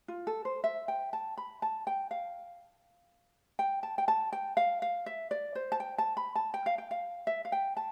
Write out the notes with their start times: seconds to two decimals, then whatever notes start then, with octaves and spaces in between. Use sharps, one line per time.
0.08 F4
0.27 A4
0.45 C5
0.64 E5
0.88 G5
1.13 A5
1.38 B5
1.62 A5
1.87 G5
2.11 F5
3.59 G5
3.83 A5
3.98 G5
4.08 A5
4.33 G5
4.57 F5
4.82 F5
5.06 E5
5.31 D5
5.55 C5
5.72 A5
5.80 G5
5.98 A5
6.17 B5
6.35 A5
6.54 G5
6.66 F5
6.78 G5
6.91 F5
7.27 E5
7.45 F5
7.52 G5
7.77 A5